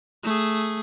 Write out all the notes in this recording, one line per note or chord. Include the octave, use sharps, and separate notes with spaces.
A3 G#4